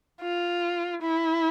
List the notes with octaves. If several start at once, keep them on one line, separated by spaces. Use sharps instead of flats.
F4
E4